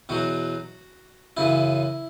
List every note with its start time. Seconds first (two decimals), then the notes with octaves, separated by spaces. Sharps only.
0.09 E2 B2 F#3 F#4
1.37 F#2 C#3 E3 E4